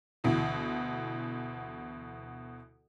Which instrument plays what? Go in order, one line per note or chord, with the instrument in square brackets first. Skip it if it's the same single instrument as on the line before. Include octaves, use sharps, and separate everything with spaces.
[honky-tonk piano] D2 B2 E3